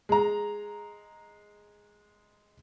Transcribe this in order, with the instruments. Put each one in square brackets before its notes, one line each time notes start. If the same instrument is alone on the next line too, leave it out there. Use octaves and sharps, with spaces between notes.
[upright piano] G#3 A#5